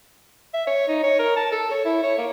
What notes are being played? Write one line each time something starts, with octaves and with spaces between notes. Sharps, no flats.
E5
C#5
D#4
C#5
A#4
A5
A4
C#5
E4
C#5
A#3